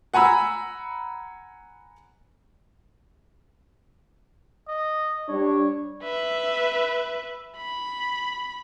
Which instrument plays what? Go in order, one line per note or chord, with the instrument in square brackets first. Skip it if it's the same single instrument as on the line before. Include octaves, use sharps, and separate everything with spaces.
[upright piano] F#5 G#5 A#5 B5 E6
[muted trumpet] D#5
[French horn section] G3 D4 [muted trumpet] C#5
[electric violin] B4 E5
B5